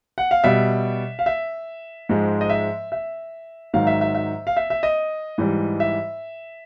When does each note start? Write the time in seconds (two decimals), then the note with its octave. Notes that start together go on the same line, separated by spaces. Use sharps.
0.18 F#5
0.31 F5
0.44 B2 G3 E5
1.19 F5
1.26 E5
2.09 G#2 F3 G#3
2.41 D#5
2.50 E5
2.92 E5
3.74 G#2 D#3 F#3 F5
3.87 E5
4.01 E5
4.14 E5
4.47 F5
4.57 E5
4.70 E5
4.83 D#5
5.38 G#2 E3 G3
5.80 E5